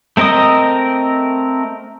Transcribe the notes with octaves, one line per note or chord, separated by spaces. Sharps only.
A3 C4 A#4 D#5 D#6